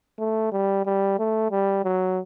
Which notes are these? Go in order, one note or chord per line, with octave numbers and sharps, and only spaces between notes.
A3
G3
G3
A3
G3
F#3